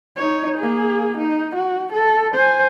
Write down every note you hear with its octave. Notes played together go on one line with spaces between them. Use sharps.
D#4 C#5
A#3 G#4
D#4
F#4
A4
C5 G#5